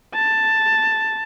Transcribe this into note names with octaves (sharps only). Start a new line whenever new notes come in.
A5